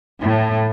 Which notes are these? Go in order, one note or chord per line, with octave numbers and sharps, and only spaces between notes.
A2